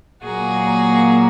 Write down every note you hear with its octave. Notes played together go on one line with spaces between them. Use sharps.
A#2 F#3 A#3 F#4 G#4